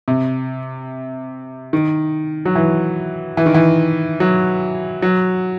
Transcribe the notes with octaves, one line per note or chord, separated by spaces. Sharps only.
C3
D#3
F#3
E3
E3
D#3
E3
F#3
F#3